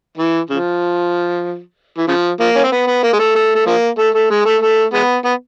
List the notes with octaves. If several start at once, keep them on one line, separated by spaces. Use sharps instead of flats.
E3
C#3 F3
E3
C#3 F3
F3 A#3
C#4
C4
B3
B3
A#3
G#3
A3
A3
A3
F3 A#3
A3
A3
G#3
A3
A3
G#3 B3
B3